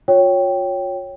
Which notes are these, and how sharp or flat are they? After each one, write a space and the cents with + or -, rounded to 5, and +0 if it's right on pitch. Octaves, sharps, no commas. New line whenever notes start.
F4 +40 C#5 +0 G5 -5